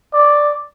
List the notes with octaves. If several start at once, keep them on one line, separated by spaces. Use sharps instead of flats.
D5